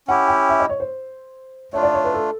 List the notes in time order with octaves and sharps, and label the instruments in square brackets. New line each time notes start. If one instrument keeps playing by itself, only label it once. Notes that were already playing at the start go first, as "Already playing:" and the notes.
[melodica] C#4 E4 G4 [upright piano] F#5
[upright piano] G5
E5
D#5
C#5
C5
[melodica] A3 D4 F4 [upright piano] C#5
[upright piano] D5
C#5
B4
A4